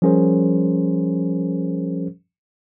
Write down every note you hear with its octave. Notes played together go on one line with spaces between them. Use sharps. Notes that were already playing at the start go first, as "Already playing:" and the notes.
F3 G3 C#4 G#4 A#4 C5